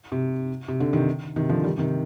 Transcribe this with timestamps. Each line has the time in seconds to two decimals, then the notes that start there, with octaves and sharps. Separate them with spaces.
0.12 C3
0.68 C3
0.80 D3
0.93 C3 D#3
1.36 C3 D#3
1.49 D3 F3
1.64 D#3 G3
1.78 C3 D#3